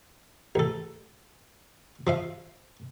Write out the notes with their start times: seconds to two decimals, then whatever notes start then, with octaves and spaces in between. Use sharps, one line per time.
0.55 A1 A4
2.07 F3 E5 F5